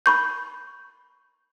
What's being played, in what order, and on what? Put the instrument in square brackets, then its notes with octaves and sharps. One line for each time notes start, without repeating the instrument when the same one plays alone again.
[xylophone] B5 C#6 G6